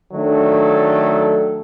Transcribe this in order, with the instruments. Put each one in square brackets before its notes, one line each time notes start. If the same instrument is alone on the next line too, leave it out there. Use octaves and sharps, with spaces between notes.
[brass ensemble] D#3 F#3 A3 D4 A4